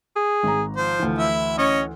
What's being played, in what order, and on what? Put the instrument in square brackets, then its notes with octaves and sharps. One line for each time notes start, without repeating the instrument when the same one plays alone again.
[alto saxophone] G#4
[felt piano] G#1 A#5
[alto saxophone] F3 [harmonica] C5
[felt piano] D2 E3
[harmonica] E4 E5
[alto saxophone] C#4 [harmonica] C#5 D#5